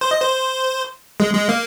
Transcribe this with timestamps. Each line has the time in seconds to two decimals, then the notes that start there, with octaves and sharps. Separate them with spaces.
0.01 C5
0.11 D#5
0.21 C5
1.20 G#3
1.34 G#3
1.49 A#3